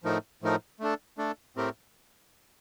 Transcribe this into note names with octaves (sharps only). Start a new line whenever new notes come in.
A2 F3 A3 D#4 A#4
A2 F3 A3 D#4 A#4
A3 D4 A4
A3 D4 A4
A2 A3 C4 G4 A#4